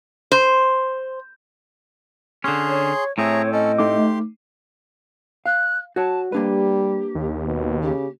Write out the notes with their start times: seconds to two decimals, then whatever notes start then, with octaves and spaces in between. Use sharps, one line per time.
0.32 C5
2.44 D3 C#4 G#4 C6
2.68 C#5
3.18 A2 A3 C4 G#4 C#5 A#5
3.52 C#4 A4 D#5
3.78 A3 D#4 G4 C6 D6
5.46 F5 F#6
5.96 F#4 C#5 A5
6.32 G3 A#3 D4 G4 B4
7.15 D#2
7.46 B2
7.82 C#3 G4